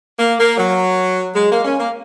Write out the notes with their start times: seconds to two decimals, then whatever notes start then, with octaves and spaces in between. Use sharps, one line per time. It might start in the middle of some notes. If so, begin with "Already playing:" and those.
0.18 A#3
0.38 A#3
0.57 F#3
1.35 G#3
1.50 A#3
1.64 C#4
1.79 A#3